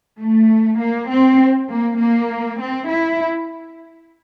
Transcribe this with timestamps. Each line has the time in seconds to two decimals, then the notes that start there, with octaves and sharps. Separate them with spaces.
0.21 A3
0.80 A#3
1.10 C4
1.70 A#3
1.99 A#3
2.60 C4
2.89 E4